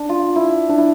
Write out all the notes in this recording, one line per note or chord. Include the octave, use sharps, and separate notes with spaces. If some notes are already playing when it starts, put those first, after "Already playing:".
Already playing: D4
F4
E4
D4
E4